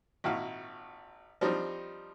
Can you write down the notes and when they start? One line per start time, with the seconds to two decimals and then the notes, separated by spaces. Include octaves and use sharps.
0.24 G#1 A#2 E4 F#4 F5
1.41 F3 G3 C4 D4 D#4